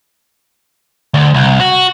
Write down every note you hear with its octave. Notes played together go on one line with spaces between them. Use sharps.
D2
C2
F#4